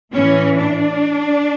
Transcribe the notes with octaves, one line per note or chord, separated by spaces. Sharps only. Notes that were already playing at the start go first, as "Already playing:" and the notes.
A2 E3 C#4
D4